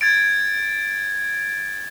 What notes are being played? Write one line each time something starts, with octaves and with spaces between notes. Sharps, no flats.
G#6 A6 D7